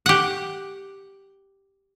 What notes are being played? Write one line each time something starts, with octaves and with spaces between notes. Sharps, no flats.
G4 F#5